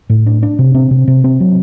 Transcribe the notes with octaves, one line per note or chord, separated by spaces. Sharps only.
A2
D4
D4
C3
C4
C3
C3
C4
F#3